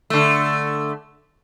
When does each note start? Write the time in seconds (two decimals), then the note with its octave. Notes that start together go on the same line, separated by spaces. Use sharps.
0.10 D3 A3